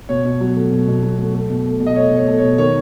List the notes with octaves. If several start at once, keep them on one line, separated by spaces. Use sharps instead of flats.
B2 C#5
B2
F#3
A3
B2
B2
F#3
A3
A3
B2
A3
B2
D#5
A3 C#5
B2
C#5
A3
C#5
B2
D#3 C#5